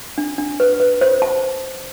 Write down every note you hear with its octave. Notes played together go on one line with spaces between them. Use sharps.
D4
D4
B4
B4
C5
A5